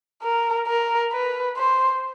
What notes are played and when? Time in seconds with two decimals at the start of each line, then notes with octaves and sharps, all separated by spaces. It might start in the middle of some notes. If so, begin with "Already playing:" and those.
0.22 A#4
0.67 A#4
1.12 B4
1.57 C5